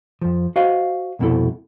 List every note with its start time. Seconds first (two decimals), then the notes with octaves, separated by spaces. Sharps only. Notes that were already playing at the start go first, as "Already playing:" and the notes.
0.21 F2 F3
0.56 F#4 C5 D#5 F5
1.19 C2 F2 B2 C4 E4 A4